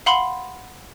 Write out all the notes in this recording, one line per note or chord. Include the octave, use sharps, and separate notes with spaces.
F5 F#5 B5 C6